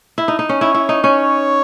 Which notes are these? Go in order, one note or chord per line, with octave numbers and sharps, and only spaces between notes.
E4
D#4
D#4
C#4
E4 C#5
E4
D#4
C#4 C#5